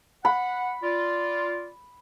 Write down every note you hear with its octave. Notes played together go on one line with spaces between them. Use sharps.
F#5 B5
F4 D5